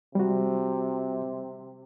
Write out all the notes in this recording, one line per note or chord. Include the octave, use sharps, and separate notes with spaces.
C3 G3 F#4